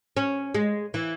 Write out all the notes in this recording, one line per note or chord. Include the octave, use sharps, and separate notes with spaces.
C#4
G#3
E3